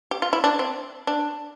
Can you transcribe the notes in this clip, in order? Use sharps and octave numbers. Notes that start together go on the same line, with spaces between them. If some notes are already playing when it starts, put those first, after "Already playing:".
G4
F4
E4
D4
C4
D4